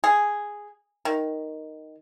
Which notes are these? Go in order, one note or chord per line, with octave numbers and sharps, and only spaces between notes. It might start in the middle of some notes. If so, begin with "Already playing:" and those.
G#4
D#3